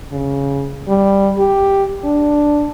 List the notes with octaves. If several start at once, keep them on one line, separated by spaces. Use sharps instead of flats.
C#3
G3
G4
D4